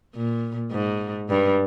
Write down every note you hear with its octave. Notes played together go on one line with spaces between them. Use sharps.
A#2
G#2
G2